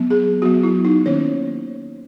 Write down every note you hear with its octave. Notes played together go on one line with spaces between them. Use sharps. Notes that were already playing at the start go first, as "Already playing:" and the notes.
Already playing: F#3 B3
G#4
F#3 B3 F#4
E4
D#4
D#3 A#3 C#4 C#5